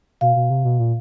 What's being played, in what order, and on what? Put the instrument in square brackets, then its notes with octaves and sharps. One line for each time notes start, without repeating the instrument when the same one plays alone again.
[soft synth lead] B2 [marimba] F5
[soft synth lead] B2
C3
B2
A#2